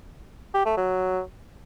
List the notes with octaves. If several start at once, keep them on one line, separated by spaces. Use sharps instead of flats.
G4
A3
F#3